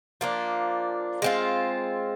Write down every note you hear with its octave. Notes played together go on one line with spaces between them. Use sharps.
F3 A#3 D4
G#3 C4 F4